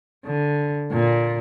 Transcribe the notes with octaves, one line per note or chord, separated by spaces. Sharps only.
D3
A#2